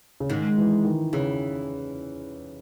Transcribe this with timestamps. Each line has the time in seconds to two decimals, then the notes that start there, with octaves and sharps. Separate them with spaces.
0.20 C#3
0.30 G#2 D#3 G#3
0.58 E3
0.85 D#3
1.13 E2 C#3 E3